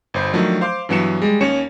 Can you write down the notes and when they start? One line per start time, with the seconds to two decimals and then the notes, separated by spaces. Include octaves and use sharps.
0.14 G1 C5 B5
0.33 D#3 F3 F#3 A3 D4
0.61 C5 F5 C6 D6
0.89 G2 E3 F#3 B3 C#7 E7
1.22 G3 G#3
1.40 D#2 C#4 C#5 C#7 E7